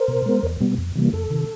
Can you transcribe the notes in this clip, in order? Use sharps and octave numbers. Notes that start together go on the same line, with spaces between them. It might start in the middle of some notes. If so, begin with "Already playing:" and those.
Already playing: A#4 C5
B2
G#3 B3
E2
B2 G3 B3
F2
C3 E3 G3 A#3
F2 A4
C3 D#3